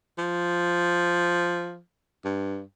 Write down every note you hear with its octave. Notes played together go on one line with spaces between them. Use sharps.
F3
G2